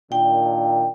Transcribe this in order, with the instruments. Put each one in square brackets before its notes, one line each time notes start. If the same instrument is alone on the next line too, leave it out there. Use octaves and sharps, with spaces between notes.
[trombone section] A#2 D#3 D4 [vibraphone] G5